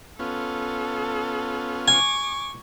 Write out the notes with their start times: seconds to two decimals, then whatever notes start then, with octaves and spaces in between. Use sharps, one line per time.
0.19 B3 C#4 F4 A4
1.88 G#5 C#6 D6